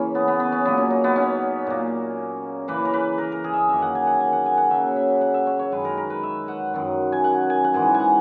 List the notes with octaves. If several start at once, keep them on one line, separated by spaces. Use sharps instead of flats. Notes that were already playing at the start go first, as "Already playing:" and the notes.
Already playing: C#3 E3 A#3 C#4
B3
B3
B3
C#4
A#2 F#3 A#3 B3
C#4
D#4
B3
C#4
A#2 A#3
C#3 E3 A#3 B4
A#4
B4
A#4
A#4
G#4
D#5 E5
F#2 D#3 A#3 E5
F#5
G#5
F#5
G#5
F#5
G#5
F#5
C#3 F#3 A#3 E5
E5
F#5
E5
C#5
C#5
F#2 D#3 G#3 B4
A#4
A#4
B4
E5
F#5
F#2 D#3 F#3
G#5
F#5
G#5
F#5
G#2 E3 G#3 G#5
G#5
F#5